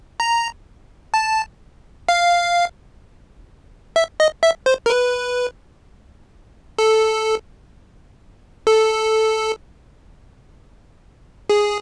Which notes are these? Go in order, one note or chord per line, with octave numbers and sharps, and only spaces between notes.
A#5
A5
F5
E5
D#5
E5
C5
A#4
B4
A4
A4
G#4